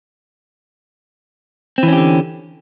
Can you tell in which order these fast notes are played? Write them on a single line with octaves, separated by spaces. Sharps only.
C4 E3 C#4 G4 D3